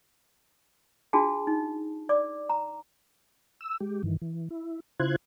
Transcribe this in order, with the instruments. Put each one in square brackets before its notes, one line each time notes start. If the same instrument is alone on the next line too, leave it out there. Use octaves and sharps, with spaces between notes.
[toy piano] D4 F4 F#4 G#4 A5
D#4
D5 D6
A#5
[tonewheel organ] E6
G#3 G4
G2 D#3 E3
E3
E4
C#3 E4 F4 C5 F#6 G#6